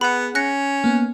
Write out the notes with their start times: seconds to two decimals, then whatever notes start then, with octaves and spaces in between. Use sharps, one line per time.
0.01 B3 G#4 F#5 B5
0.35 C#4 F#6 A#6 C#7
0.84 A#3 B3